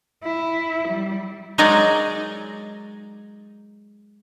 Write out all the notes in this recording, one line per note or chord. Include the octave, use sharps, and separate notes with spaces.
E4
G3
F#3 G#3 D#4 G#4 A#4 D5